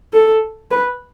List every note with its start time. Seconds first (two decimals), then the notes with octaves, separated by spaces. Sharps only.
0.13 A4
0.71 B4